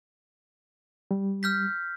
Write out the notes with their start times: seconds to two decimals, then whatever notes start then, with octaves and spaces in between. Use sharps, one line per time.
1.11 G3
1.43 F6 G6 B6